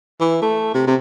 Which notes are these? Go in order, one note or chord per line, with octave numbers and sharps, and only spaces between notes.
E3
A3
C3
C3